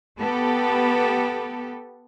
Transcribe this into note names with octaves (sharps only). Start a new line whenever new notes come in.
B3 G4 A4